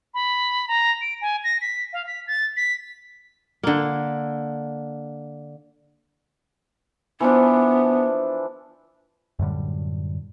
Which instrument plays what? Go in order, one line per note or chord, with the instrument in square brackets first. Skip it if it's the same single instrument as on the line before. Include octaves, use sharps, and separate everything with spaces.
[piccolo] B5
A#5
D7
G#5
A#6
B6
F5
B6
A6
B6
[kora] D3 A#3
[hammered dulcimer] E3 F3 D4 [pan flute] B3
[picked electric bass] F#2 A2 D3 G3